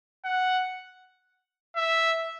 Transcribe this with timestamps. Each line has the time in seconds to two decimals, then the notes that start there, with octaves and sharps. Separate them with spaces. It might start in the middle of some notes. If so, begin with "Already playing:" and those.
0.25 F#5
1.76 E5